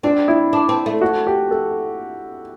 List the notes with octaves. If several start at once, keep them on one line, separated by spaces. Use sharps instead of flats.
C4 D4
E4
D4
C4
A3
F#4
G4
A4